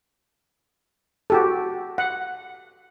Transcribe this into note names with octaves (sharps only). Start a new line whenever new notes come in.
F#4 G4 A4
F#5